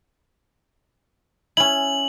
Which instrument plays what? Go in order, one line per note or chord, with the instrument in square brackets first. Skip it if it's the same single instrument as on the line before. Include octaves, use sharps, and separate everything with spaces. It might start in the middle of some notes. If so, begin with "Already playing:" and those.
[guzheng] C#4 E4 [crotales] F#7